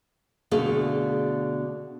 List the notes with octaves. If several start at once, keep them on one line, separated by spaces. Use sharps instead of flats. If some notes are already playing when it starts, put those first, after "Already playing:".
B2 D3 A3 G#4 F5